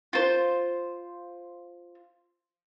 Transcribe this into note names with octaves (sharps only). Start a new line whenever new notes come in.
F4 C5